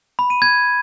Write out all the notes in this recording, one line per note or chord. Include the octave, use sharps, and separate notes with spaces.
B5
D#7
G#6